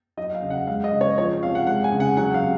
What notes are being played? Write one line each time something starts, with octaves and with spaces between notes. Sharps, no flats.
F#3 D#5
F5
C#3
F#5
G#3 F5
D#5
C#3
C#5
F3 C#5
C3 F5
F#5
G#3 F#5
G#5
C#3
F#5
F#3 F#5
F5
C3